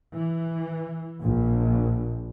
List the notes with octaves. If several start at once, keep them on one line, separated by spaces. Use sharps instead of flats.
E3
A#1